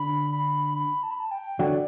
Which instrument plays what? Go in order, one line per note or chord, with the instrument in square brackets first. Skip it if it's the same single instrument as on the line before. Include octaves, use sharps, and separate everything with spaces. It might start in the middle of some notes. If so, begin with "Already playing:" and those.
Already playing: [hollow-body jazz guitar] D3 [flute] B5
[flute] B5
B5
A5
B5
A5
G5
[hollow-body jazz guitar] D3 F#3 [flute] D5